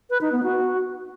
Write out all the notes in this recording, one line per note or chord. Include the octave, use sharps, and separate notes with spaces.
B4
D#4
B3
F#4